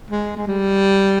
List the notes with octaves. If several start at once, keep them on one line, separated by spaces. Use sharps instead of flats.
G#3
G#3
G3